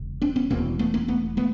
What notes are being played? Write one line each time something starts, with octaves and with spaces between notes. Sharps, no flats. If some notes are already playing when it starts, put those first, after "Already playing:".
Already playing: E1 C#3
C4 D4
B3 C#4
E1 E2 B2 A#3 C4
A3 B3
A#3 C4
A3 B3
A3 B3